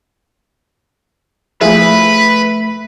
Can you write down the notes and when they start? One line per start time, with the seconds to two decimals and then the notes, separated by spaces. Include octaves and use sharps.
1.61 F3 A3 E4 G#4 B4 E5 B5